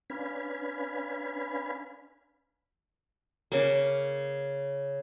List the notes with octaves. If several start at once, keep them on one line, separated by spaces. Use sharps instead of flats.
C#4 D4 B4 F5 G#5 B5
C#3 A#3